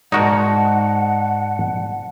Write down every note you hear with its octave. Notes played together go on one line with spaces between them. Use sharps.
G#2 G#3 D#4 F#4 A#4 D5 F#5 A5